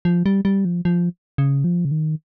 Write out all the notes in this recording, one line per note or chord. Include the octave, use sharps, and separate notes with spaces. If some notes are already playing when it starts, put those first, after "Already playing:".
F3
G3
G3
F3
F3
C#3
F3
C#3
D#3